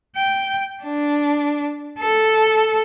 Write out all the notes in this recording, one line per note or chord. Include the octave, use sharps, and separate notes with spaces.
G5
D4
A4